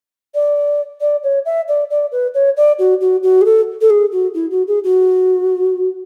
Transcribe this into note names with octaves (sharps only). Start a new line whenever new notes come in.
D5
D5
C#5
E5
D5
D5
B4
C#5
D5
F#4
F#4
F#4
G#4
A4
A4
G#4
F#4
E4
F#4
G#4
F#4